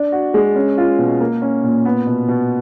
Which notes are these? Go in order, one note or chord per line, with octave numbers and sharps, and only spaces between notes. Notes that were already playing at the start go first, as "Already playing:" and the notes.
Already playing: D4
F#4
G#3
C#4
F4
B2
A#3
C#4
A#2
B3
B2
B2